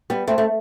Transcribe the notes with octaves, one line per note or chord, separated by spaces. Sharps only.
G3 B3
A3 C4
A3